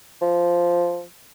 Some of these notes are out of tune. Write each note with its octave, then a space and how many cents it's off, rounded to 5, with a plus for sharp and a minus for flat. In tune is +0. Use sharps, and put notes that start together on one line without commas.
F3 -5